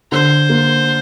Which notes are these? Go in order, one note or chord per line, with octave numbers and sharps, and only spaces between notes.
D3 C5
A#3